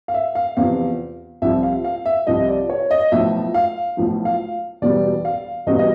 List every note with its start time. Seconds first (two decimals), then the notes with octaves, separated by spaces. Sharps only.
0.08 F5
0.14 E5
0.35 F5
0.57 E2 C3 F3 F5
1.42 C2 C3 F3 E5
1.63 F5
1.84 F5
2.06 E5
2.27 C2 C3 F3 D#5
2.48 D5
2.70 C#5
2.91 D#5
3.12 B1 A2 F3 E5
3.54 F5
3.97 B1 A2 F3
4.25 F5
4.82 E1 E2 B2 G3 D5
5.25 F5
5.67 E1 E2 B2 G3 D#5
5.79 D#5